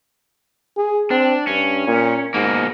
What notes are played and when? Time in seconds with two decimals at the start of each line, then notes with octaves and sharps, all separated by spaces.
0.77 G#4
1.11 C4 D4
1.47 G2 C#4
1.87 A#2
2.34 G#2 B2 A#3